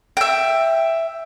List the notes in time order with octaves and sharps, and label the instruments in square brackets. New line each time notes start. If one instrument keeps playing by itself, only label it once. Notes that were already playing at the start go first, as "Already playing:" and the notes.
[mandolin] E5 G5